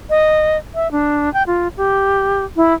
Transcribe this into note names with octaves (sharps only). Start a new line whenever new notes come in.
D#5
E5
D4
G5
F4
G4
E4